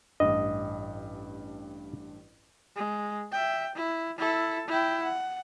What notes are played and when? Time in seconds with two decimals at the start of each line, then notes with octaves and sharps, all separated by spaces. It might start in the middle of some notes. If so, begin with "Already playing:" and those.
0.20 A1 G2 D#5
2.76 G#3
3.32 E5 G5
3.76 E4
4.18 E4 A4
4.68 E4 G5
5.02 F#5